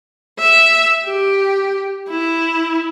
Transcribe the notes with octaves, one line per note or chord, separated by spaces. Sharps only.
E5
G4
E4